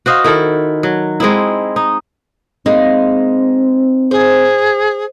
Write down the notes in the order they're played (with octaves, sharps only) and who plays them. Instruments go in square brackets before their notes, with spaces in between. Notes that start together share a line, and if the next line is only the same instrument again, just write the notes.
[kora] F#4 C5 D#5 F5
D#3 E4 A4
F#3
G#3 C4 D#4 E4
D#4
[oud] G#3 A#3 [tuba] C4 [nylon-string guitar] D#4
[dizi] G#4 [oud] C5